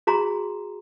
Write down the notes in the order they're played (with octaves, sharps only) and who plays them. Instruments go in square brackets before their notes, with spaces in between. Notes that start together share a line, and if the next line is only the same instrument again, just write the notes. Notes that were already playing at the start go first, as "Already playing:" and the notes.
[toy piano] F#4 G#4 A#5 C6